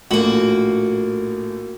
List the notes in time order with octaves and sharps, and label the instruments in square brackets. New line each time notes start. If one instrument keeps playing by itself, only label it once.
[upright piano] A#1 A2 F#7 [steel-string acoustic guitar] A#3 F#4